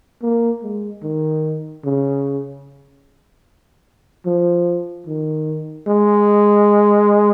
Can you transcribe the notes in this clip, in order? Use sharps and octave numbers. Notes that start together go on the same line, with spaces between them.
A#3
G#3
D#3
C#3
F3
D#3
G#3